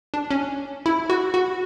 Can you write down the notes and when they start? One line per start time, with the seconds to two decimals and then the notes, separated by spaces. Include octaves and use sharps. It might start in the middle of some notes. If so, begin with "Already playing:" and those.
0.14 D4
0.31 C#4
0.86 E4
1.10 F#4
1.34 F#4